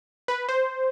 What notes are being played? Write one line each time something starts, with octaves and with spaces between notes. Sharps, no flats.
B4
C5